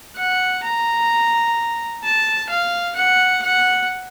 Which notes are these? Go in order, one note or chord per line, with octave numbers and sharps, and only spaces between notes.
F#5
A#5
A5
F5
F#5
F#5